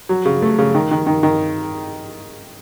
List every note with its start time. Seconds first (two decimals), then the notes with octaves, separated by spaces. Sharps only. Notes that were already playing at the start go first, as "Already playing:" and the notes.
0.09 F#3
0.25 C#3
0.42 A3
0.58 C#3
0.74 D#3
0.91 D#3
1.07 D#3
1.23 D#3